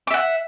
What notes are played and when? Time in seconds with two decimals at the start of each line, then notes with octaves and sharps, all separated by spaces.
0.07 D6
0.11 E5
0.14 F#5